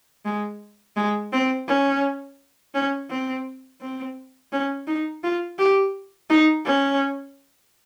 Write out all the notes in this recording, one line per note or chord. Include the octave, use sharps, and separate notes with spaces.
G#3
G#3
C4
C#4
C#4
C4
C4
C#4
D#4
F4
G4
D#4
C#4